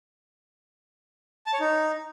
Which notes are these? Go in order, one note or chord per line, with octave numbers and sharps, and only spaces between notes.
A5
C#5
D#4